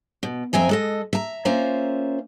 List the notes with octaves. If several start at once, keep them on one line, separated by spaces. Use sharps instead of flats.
B2
F2 C4 E5 G#5 A#5
G#3 A4 D#5
E5 A#5
A#3 C#4 F4 C5 E5 A#5